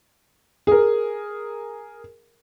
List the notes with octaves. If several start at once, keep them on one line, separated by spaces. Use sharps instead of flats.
G#4 A#4